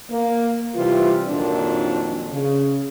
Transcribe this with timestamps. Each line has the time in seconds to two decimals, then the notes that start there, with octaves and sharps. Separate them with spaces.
0.11 A#3
0.75 C3 E3 G3 F4
1.28 F2 A#2 D#3 F#3 D4
2.32 C#3